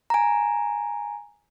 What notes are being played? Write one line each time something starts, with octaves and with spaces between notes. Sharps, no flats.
G#5 A#5